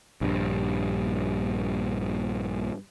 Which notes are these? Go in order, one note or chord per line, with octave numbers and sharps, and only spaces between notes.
A#1 G2